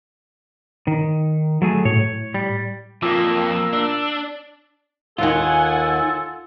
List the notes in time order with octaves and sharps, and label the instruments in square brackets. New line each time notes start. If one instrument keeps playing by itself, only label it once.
[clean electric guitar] D#3
F#3 A3 G#4
[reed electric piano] A2 [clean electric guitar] C#5
[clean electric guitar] G3
[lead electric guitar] F2 [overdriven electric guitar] A#2 A#3 [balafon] F4 [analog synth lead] E6
[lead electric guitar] D4
[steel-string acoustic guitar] D#2 D#3 [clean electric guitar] F4 [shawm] A4 [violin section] F#5 G#5